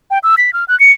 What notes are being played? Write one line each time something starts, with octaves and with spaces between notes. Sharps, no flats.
G5
E6
B6
F6
F#6
C#7